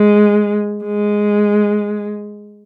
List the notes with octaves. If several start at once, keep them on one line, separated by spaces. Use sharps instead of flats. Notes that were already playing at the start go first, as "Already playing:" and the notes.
Already playing: G#3
G#3